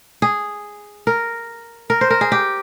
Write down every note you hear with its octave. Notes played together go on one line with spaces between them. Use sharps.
G#4
A#4
A#4
C5
A#4
G#4
G4